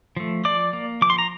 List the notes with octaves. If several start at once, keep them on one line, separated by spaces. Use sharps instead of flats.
F3 A3
F3 D5 D6
A#3
F3 D6
C6
A#5